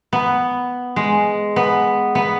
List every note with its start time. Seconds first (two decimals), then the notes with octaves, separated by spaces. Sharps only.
0.13 B3
0.96 G#3
1.56 B3
2.15 B3